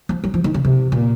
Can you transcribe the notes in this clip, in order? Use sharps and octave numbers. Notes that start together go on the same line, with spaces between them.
F3
F#3
F3
D#3
C#3
C3
A#2